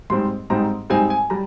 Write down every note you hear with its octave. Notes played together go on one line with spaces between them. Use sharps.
G#2 G3 C4 D#4 C6
G#2 G3 C4 D#4 A#5
G#2 G3 C4 D#4 G#5
G#5
G3 A#5